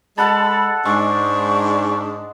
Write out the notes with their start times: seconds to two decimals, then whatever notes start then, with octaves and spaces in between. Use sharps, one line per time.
0.18 G#3 A4 F#5 A5 B5
0.85 G#2 G#3 D4 C#6